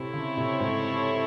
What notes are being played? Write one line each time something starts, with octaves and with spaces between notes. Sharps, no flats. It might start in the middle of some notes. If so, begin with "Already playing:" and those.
Already playing: C3 C4 E4 A4 C#5
C#3
C3
G#2